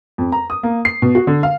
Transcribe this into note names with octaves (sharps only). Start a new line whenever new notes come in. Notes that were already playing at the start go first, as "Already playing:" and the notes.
F2
A#5
D#6
A#3
C7
B2
F#4
D3
F5